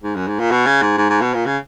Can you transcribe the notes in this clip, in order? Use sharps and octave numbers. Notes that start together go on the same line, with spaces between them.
G#2
F#2
G#2
A#2
B2
C#3
G#2
G#2
G#2
B2
A#2
C#3